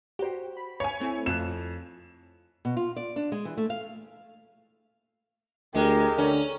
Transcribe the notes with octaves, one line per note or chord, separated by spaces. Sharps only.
F#4 G4 C5
B5
C#5 G#5
A3 C4 E4
F2 F4 F#6 E7
B2
F4
D5
D4
G#3
E3
A3
F5
D2 G#3 G4 A#4
D3 C#4